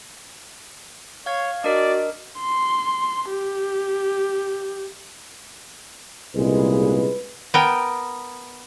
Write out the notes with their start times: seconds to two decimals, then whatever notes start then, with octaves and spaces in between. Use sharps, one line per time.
1.26 C#5 F5 G#6
1.64 D4 F#4 A#4 D5 D#5
2.40 C6
3.30 G4
6.35 C2 A#2 C#3 G#3 B4
7.54 B3 A#4 G5